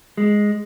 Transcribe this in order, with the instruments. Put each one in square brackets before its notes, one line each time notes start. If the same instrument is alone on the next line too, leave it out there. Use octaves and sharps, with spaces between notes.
[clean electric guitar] G#3